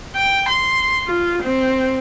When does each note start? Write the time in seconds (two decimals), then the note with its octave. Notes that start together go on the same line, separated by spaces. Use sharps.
0.16 G5
0.49 C6
1.07 F4
1.43 C4